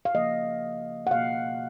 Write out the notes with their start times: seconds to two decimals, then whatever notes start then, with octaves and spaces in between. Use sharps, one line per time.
0.05 F5
0.15 C#3 F3 A#3 D#5
1.07 F#5
1.11 B2 A#3 F5